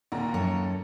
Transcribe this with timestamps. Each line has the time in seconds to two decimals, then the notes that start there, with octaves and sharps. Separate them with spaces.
0.12 D#2 A#2 A#5
0.34 F#2 A4 C#5